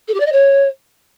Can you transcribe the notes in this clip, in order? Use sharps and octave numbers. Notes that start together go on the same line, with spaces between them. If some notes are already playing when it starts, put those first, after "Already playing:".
A4
G4
D5
D#5
C#5